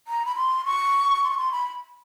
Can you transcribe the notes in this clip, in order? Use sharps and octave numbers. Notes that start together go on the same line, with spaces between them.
A#5
B5
C6
C#6
C6
C#6
C6
B5